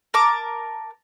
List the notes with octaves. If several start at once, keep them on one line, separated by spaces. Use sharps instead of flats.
A#4 A5 D6